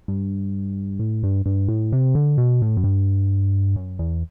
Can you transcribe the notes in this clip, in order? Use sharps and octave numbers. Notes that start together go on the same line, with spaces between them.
G2
A2
G2
G2
A2
C3
D3
B2
A2
F#2
G2
F#2
E2